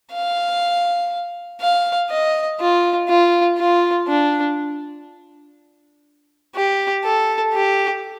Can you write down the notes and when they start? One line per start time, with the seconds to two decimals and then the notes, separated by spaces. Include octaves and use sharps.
0.13 F5
1.61 F5
2.11 D#5
2.60 F4
3.09 F4
3.58 F4
4.08 D4
6.55 G4
7.05 A4
7.53 G4